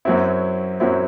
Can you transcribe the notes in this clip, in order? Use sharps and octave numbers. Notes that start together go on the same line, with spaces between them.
F#2 F#3 C4 E4
F#2 F#3 C4 E4